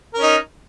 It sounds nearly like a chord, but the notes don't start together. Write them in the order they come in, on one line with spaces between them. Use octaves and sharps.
A#4 C#4 D#4